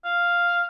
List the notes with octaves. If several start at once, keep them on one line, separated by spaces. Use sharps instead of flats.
F5